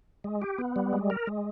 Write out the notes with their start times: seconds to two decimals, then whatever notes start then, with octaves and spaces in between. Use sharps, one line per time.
0.24 G#3
0.42 G4
0.58 B3
0.76 G3
0.93 G#3
1.10 A#4
1.27 G#3